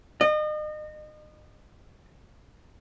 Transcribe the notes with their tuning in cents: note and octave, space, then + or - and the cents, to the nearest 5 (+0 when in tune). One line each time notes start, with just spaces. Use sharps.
D#5 -35